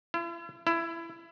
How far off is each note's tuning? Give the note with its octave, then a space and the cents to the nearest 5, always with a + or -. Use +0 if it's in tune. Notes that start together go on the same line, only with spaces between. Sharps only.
E4 +45
E4 +20